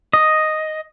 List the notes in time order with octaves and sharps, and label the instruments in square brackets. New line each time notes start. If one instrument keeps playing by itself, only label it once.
[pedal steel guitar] D#5